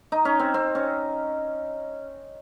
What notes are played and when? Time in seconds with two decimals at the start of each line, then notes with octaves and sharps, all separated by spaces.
0.12 D#4
0.25 C#4
0.40 C4
0.54 C4
0.75 C#4